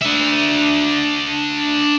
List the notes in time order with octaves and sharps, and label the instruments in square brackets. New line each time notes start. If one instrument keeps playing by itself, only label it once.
[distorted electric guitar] D4 E5